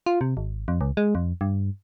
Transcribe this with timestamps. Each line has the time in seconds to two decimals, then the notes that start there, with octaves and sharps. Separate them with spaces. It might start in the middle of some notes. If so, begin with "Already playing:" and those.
0.06 F4
0.21 C3
0.37 G#1
0.68 F2
0.81 C#2
0.97 G#3
1.15 F2
1.41 G2